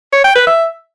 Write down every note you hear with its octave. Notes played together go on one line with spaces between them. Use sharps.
C#5
G5
B4
E5